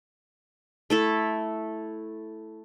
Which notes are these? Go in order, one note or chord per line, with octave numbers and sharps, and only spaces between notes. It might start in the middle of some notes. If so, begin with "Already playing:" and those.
A3 E4 A4